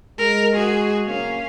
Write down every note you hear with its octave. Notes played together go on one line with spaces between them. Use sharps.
G#3 A#4
F#4 G#4
F#2 C#3 A#3 C#4 F5